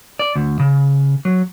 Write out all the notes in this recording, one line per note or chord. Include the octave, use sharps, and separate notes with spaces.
D5
D2
C#3
F#3